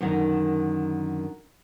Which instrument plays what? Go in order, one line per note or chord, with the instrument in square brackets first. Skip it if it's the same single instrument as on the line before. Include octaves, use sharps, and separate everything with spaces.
[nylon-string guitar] F#2 D3 D#3